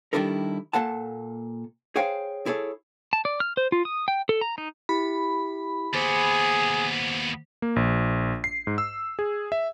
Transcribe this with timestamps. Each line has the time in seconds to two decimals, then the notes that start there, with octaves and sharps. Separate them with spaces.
0.13 D#3 G3 D4 E4 A4 A#4
0.73 A#2 A#3 A4 F#5 A5
1.96 G#4 C5 C#5 F5 G5
2.46 E4 G#4 A4 C#5
3.13 A5
3.25 D5
3.40 F6
3.57 C5
3.72 F4
3.85 D#6
4.08 G5
4.29 A4
4.41 A#5
4.58 D#4
4.89 E4 G4 B5
5.94 D#2 B3 G#4 C5 D6 A6
7.62 A#3
7.76 A#1
8.44 C7
8.67 G#2
8.78 E6
9.19 G#4
9.52 E5